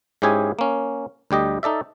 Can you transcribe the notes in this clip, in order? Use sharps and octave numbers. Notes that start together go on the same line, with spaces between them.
G#2 C#4 E4 G4 G#4 G#5
A#3 C#4
D2 G3 G4 D#5
D#4 A4 D5 E5